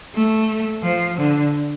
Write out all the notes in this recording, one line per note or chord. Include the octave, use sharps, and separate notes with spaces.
A3
F3
D3